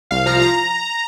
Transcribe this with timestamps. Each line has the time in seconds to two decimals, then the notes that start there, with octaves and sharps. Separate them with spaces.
0.11 C2 F5
0.26 F3 A#5
0.42 A#5